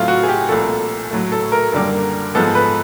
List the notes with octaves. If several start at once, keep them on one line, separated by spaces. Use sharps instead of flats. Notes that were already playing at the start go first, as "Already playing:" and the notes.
Already playing: A2 F#3 A3 C4 F4
F#4
G#4
G4
C2 A#2 F3 A3 A4
A2 F#3 A3
A4
A#4
F#2 D3 G3 A#3
G#2 F3 G#3 B3 A4
B4